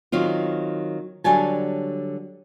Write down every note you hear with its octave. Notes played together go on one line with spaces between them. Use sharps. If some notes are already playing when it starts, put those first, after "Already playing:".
D#3 F#3 C4 F4
D3 F#3 G3 C#5 G#5 A5